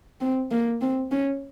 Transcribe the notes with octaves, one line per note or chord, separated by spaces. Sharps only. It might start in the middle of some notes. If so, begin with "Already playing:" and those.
C4
A#3
C4
C#4